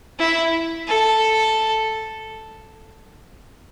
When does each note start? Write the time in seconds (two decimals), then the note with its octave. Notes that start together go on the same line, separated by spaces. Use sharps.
0.19 E4
0.87 A4